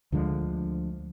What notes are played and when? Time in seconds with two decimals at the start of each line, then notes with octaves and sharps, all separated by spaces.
0.12 D2 D3 F3 G#3